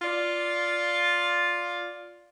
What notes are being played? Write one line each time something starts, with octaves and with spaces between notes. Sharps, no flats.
F4 D5